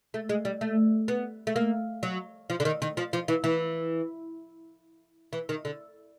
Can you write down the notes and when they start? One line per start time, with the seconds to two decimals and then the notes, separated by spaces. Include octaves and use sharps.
0.14 A3
0.29 G#3
0.45 G3
0.61 A3
1.08 B3
1.47 A3
1.56 A#3
2.03 F#3
2.50 F3
2.60 D3
2.65 D#3
2.82 D#3
2.97 F3
3.13 F3
3.28 E3
3.44 E3
5.33 E3
5.49 D#3
5.65 D3